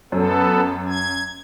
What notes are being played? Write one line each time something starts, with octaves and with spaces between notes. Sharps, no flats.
F#2 B3 A4
G#6